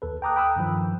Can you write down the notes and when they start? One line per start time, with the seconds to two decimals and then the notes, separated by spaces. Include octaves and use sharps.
0.02 D#2 A4 B4
0.22 G5 A5 A#5 D6 D#6 F#6
0.36 G5 B5 D#6 E6 F#6
0.56 G2 D#3 F3